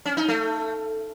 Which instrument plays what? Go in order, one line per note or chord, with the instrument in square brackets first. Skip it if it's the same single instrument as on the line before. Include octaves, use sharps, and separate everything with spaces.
[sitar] C#4
D#4
A3